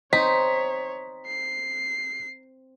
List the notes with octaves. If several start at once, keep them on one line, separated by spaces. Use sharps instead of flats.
C4 D#4 C#5 B6
C7